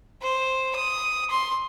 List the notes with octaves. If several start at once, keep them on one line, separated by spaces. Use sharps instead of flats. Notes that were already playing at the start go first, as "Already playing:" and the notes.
C5
D#6
C6